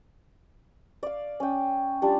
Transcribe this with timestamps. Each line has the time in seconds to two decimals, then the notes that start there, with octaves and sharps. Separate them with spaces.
1.03 D5 F5
1.40 C#4 G5
2.02 G3 D4 F4